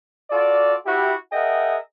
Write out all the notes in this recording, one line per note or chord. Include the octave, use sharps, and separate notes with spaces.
F4 F#4 A4 D5
E4 F#4 G4
G#4 A#4 D#5 E5 F#5 G5